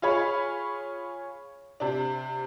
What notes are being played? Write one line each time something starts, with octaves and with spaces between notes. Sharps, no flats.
F4 G#4 C#5 B5
C3 D4